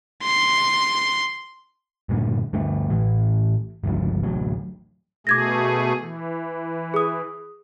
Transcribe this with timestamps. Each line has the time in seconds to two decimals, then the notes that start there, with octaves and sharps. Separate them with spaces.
0.23 C6
2.09 G2 A#2 D3
2.53 G2 D3 A3
2.90 A2 E3
3.84 G1 C#2 G2 F3
4.23 A1 D2 F#3
5.27 B2 A3 G#4 D6 G#6 A#6
5.99 E3
6.94 G#4 D#6